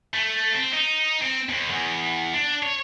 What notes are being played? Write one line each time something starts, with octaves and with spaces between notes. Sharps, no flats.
A3
C4
D#4
C4
D#2
E2
D4
C#5